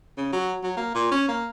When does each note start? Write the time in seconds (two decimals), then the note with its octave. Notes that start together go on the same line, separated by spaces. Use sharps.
0.18 C#3
0.33 F#3
0.64 F#3
0.77 A#3
0.95 A#2
1.12 C#4
1.29 A#3